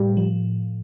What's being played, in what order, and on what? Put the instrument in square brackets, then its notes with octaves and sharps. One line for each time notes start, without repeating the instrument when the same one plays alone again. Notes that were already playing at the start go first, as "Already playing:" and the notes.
Already playing: [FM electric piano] A2 [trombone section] G3
[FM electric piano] F3